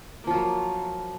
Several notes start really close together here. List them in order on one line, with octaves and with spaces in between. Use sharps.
A#3 F3 F4 F#3